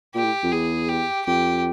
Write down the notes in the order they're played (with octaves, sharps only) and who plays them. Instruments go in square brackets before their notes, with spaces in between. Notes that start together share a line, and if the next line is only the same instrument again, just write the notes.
[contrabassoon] A#2 [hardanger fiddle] G4
[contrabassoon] A2
F2
[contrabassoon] E2 [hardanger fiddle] G#4
[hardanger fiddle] G4
[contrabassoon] F2 [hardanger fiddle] G4